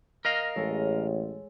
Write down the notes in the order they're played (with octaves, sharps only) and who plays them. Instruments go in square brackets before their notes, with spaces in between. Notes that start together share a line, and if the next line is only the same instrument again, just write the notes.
[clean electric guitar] A#4 D#5 F5
[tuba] A1 [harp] G#3 A4 C#5